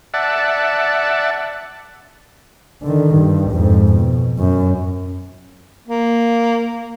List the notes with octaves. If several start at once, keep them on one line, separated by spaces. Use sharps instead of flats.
D5 E5 F#5 A5
D3 D#3
G2
F2 G#2
B2
F#2
A#3